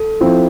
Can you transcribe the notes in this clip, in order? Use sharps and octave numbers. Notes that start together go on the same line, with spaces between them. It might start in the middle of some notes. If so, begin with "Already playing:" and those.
Already playing: A4
F3 C4 E4